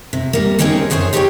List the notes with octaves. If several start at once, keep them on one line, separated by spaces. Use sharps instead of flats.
C3
G3 A#3
E3 A#3 C4 C#4 D#4 G#4
F#2 G#4 C5 C#5 G#5
D#4 G4 G#4 B4 C#5 G5